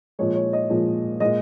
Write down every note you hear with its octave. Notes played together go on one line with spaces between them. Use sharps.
A#2 F3 G#3 C#5
C#5
D#5
A#2 F3 G#3
A#2 G#3 D#5